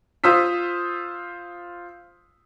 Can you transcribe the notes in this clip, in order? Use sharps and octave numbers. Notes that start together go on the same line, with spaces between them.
F4 C5 D#6 E6 B6